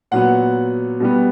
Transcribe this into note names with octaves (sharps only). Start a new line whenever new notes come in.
A#2 F#3 B3 F#5
B2 G3 B3